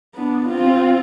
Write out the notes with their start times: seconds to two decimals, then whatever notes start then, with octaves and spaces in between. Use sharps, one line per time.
0.15 B3 D4
0.49 C4 F4